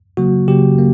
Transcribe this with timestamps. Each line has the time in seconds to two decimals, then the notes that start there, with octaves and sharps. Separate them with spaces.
0.17 C#3 F#3 A#3 F#4
0.48 C#3 F#3 A#3 G4
0.79 A#3